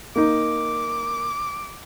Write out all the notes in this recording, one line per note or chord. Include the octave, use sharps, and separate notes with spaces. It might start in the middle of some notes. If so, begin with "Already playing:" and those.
A#3 D#4 D6